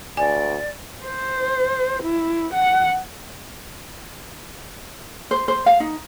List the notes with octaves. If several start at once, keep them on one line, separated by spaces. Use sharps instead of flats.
D2 D5 G#5
C5
E4
F#5
C5
C5
F5
D#4